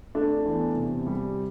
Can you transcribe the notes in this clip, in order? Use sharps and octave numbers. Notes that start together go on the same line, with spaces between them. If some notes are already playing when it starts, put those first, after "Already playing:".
A3 D4
E2
C3
G3